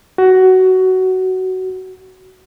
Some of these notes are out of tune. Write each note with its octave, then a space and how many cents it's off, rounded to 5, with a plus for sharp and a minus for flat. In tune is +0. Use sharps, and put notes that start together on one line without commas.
F#4 +15